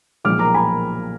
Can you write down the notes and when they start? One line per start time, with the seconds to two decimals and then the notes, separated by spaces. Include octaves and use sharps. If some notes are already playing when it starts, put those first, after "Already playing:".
0.24 B1 A#2 F3 G#3 D6 F6
0.39 A#5 D6
0.54 G#5 B5